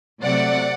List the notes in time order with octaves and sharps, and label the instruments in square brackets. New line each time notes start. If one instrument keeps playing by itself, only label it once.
[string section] C3 F#3 A3 D5 F#5